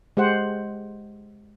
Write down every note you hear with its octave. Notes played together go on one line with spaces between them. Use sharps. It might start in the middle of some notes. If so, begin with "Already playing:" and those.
G#3 G4 C5 F#5